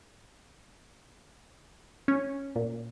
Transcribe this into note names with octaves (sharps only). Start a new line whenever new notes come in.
C#4
A#2